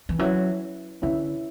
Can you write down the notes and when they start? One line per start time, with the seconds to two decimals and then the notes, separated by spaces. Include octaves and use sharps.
0.09 E3
0.19 F#3 C#4 E4 B4 E5
1.02 D3 C#4 E4 B4 E5